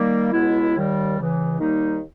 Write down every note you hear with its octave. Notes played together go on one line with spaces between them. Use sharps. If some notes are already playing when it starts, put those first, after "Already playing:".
Already playing: D#3 G3 A#3
C#2 B2 G#3 B3 E4
D#2 D#3 G3
C#2 C#3 E3
D#2 D#3 G3 A#3 D#4